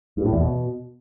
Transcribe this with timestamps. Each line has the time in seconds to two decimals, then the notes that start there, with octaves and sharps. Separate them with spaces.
0.17 G2
0.25 A2
0.33 E2
0.40 B2